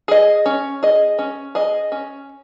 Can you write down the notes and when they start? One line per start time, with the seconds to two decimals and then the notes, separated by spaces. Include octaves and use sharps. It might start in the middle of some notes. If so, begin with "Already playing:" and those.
0.08 G#4 D#5
0.46 C#4
0.83 G#4 D#5
1.19 C#4
1.55 G#4 D#5
1.92 C#4